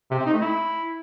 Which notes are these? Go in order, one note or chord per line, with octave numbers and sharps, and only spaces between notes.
C3
C4
D#4
A3
E4